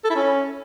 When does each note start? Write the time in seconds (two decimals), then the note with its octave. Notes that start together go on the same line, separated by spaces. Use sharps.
0.04 A4
0.10 E4
0.15 C#4